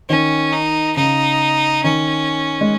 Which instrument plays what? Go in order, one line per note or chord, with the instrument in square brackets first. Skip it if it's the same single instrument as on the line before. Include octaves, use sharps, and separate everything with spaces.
[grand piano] D#3 [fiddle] C#4
[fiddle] D#4
[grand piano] C#3 [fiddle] D#4
[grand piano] D#3 [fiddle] C#4
[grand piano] G#3